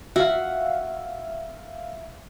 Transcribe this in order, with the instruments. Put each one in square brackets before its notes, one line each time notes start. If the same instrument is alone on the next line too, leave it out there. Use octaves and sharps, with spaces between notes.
[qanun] F#4 [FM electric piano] E5 F5